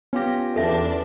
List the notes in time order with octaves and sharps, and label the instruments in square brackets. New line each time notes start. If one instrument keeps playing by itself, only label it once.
[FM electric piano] B3 A#6 [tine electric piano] C#4 F4 G4
[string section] E2 D4 [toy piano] A4 E5